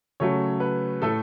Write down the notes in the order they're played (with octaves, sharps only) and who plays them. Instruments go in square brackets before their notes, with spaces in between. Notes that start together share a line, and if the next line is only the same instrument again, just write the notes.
[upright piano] C#3 F#3 A3 C#5
B4
A2 A3 A4